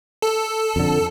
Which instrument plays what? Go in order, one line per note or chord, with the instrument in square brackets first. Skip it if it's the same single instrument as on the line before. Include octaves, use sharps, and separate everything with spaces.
[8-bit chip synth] A4
[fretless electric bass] F2 D3